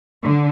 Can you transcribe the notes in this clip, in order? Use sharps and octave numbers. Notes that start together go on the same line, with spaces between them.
D3